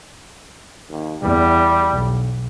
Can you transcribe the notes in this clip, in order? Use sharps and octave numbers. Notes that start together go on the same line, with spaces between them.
D#2
E2 G3
B1